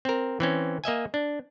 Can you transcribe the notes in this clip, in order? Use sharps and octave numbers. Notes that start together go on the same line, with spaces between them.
C4 A#4
E3 C4 C#4
A#3 D#5 E5 G#5
D4